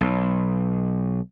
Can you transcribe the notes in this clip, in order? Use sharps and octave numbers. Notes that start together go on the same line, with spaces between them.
B1